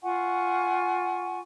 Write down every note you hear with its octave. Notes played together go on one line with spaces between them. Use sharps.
F4 F#5 G#5 C#6